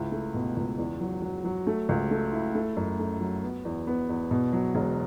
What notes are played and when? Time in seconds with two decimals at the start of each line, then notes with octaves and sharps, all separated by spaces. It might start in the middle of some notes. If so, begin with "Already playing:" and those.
Already playing: C#2 E4
0.12 A3
0.34 B2
0.57 C#2
0.78 E2
1.01 F#3
1.22 F#3
1.45 F#3
1.67 A3
1.89 C#2
2.11 A3
2.32 E4
2.55 A3
2.77 F#2
2.99 A3
3.20 F#3
3.43 B3
3.65 E2
3.87 B3
4.09 E2
4.31 B2
4.53 F#3
4.75 E1